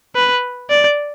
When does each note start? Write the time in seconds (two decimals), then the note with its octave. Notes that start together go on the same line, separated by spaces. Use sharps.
0.15 B4
0.70 D5